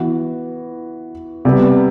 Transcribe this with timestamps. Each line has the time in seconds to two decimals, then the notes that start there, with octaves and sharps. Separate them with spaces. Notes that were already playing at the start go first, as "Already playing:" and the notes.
Already playing: E3 B3 F#4
1.45 C3 G3 B3